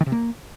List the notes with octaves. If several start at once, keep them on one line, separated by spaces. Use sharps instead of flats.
D#3
C3
A#3